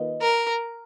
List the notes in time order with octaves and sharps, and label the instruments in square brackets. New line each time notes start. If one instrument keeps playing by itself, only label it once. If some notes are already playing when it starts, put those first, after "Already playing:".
Already playing: [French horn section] D#3 A#3 F4 B4 D#5
[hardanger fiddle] A#4